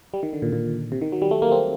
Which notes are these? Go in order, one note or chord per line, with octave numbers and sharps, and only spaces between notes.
G3
D#3
D3
A#2
A#2
C3
D#3
F#3
G3
A3
A#3
C4